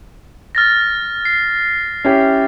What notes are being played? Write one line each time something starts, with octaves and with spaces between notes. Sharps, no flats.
F6 A6 A#6
C7
C#4 E4 G4